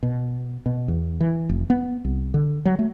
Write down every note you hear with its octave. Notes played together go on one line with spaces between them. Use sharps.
B2
B2
E2
E3
F1
B3
C2
D3
F#3
A3